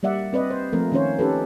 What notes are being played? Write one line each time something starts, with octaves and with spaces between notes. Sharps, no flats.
G3 A#3 D5 E5 F#5
C4 B4 D5 D#5
C5
F3 A3 A#3 C4 A#4
D#3 C#4 F4 C5 C#5
C#4 D#4 G4 A4 B4